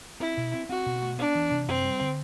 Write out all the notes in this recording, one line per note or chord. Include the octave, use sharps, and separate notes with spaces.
C4 E4
B2
C4
C4 F#4
B2
A3
B3 D4
E3
C3
F#2 C4
G3
D3